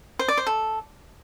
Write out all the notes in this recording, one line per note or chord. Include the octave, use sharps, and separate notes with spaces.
C5
D5
C5
A4